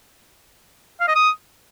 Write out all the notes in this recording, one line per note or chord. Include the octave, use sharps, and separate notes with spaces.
F5
D#5
D#6